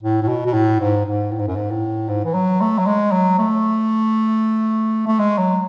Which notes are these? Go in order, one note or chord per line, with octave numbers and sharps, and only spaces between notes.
A2
A2
B2
B2
A2
G#2
G#2
A2
G#2
F#2
G#2
A2
G#2
E3
F#3
A3
F#3
G#3
F#3
A3
A3
G#3
F#3